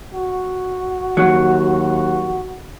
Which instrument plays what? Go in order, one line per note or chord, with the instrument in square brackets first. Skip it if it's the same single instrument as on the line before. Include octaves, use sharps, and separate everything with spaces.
[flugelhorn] F#4
[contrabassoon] D#2 [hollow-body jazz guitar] F#3